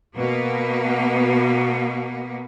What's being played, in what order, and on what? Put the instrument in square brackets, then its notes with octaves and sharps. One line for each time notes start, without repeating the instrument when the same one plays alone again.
[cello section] B2 A#3 B3